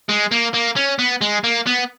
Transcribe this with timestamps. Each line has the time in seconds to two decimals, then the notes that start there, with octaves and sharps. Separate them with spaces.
0.09 G#3
0.32 A#3
0.54 A#3
0.76 C#4
0.99 B3
1.21 G#3
1.44 A#3
1.66 B3